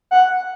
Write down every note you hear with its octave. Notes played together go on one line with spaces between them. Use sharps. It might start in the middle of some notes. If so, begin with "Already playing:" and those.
F#5